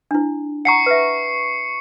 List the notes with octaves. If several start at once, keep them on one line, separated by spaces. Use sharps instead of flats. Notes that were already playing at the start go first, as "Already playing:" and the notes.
D4 E4
F#5 G#5 A#5 C#6 C7 C#7
B4 E5